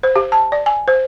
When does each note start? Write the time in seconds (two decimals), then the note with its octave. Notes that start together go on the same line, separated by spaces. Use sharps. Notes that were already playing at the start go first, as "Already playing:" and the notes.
0.03 C5
0.16 G4
0.32 A5
0.52 D5
0.66 G#5
0.88 C5